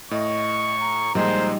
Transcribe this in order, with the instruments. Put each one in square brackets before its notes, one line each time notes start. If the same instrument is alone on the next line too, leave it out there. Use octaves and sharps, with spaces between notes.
[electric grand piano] A2 [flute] D#5 [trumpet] C#6
[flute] A#5
[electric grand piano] A#2 F3 G#3 [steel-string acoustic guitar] G3 D#4 [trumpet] C5